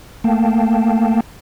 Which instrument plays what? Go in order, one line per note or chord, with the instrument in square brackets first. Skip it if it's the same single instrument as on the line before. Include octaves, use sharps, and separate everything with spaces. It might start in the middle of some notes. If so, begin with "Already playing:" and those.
[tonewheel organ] A3 A#3 F5 G5 A5